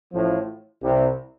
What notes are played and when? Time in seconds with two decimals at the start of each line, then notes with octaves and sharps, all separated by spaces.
0.11 A1 A2 F3
0.81 C2 C3 G3